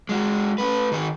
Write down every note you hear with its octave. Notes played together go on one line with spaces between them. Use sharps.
G#3 F#4
A3 B4
D#3 G#4